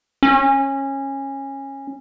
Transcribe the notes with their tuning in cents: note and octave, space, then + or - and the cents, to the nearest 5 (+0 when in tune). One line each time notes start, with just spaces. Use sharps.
C#4 -20